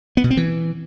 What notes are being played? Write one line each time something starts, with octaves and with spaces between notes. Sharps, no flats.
B3
B2
C4
E3